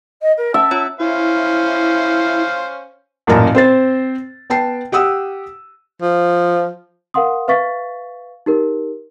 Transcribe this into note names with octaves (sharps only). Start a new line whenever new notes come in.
D#5
A#4
C#4 E5 A5
C#4 F4 C#5
C#4 E4 C5 F5
A1 F#2 A#2 A#3 A5 A#5
C4 C5 A6
B3 G5 A5 C7
G4 F#5 D#6 E6
F3
A#4 F5 F#5 C6 D#6
B4 E5 F5 C#6 A6 B6
D#4 G4 A#4